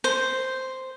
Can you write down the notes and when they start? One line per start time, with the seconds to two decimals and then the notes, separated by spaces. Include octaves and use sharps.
0.04 C5